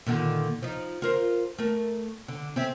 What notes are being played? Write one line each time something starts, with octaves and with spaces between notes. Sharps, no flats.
A#2 D3 D#3
F3 D#4
F4 A#4 C5
A3 A#4
D3
C4 G#4 E5